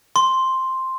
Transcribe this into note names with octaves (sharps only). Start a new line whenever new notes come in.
C6